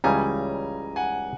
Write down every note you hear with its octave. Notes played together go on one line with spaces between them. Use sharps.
C#2 C#3 E3 G3 G#5 A#5
F#5 G#5